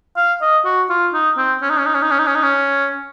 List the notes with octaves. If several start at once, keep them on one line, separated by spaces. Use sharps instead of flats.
F5
D#5
F#4
F4
D#4
C4
C#4
D#4
C#4
D#4
C#4
D#4
C#4
D#4
C#4
D#4
C#4